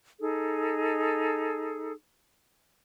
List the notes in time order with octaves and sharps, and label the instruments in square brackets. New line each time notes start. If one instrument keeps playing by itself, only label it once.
[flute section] D#4 G#4 A4